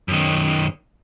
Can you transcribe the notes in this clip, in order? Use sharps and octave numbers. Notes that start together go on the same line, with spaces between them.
F#2 D#3